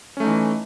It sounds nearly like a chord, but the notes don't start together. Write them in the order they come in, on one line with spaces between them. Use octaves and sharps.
C#4 A3 D#4 E3